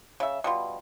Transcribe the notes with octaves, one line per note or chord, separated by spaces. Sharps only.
C#3 E5
B2 G3 F4